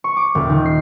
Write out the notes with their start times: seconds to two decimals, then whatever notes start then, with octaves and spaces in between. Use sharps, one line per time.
0.04 C#6
0.17 D6
0.35 D#1
0.50 D#3
0.66 C7